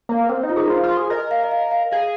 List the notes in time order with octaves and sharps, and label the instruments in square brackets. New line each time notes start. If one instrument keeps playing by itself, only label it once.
[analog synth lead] A#3
[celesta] A#4
[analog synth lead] C4 [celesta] C5
[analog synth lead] D#4
[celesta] F4
[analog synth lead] D#4 [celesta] G#4
[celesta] A#4
[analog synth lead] F4 [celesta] C5
[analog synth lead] F4
G#4
[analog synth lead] A#4 [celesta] D#5
[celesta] F5
D#5
F5
F5
[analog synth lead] G#4 [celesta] F5